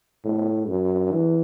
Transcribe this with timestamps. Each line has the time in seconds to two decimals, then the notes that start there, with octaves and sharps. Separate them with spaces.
0.24 A2
0.68 F#2
1.12 E3